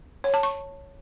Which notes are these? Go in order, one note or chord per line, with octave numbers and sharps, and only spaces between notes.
C#5
A5
C#6